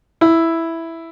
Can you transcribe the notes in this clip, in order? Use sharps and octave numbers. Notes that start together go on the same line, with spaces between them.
E4